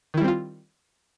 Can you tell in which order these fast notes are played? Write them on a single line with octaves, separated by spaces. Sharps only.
D#3 E4 G3 C4 F4